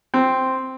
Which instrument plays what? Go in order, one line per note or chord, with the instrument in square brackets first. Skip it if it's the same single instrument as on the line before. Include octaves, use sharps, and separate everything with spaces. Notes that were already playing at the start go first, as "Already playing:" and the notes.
[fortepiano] C4